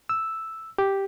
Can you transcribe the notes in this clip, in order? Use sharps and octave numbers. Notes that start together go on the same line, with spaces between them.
E6
G4